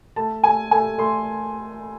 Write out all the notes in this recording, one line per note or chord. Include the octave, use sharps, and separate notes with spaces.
A3 A5
A3 G#5
A3 G#5
A3 C6